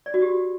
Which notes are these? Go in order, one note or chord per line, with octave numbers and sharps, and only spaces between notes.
D5
F#4
G4